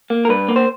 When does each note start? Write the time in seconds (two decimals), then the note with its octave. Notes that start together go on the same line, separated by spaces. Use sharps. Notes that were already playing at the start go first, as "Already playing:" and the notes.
0.10 A#3
0.25 A#4
0.29 G2 B4
0.48 A#3
0.56 C5